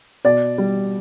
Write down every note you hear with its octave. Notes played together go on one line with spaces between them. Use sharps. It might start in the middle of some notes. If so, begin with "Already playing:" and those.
B2 D5
G3